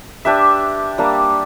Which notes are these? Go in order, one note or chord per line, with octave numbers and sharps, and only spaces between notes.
D4 G4 B4 E5
G3 A#3 D4